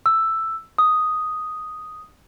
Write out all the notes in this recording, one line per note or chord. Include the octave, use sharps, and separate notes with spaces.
E6
D#6